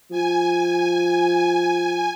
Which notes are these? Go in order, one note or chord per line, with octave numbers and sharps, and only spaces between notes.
F3 G#5